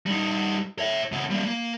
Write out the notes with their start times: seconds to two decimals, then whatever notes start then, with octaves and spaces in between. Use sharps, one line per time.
0.06 G3 D#4
0.79 C#5 E5
1.12 C#3 B3
1.30 G3 A#3
1.45 A#3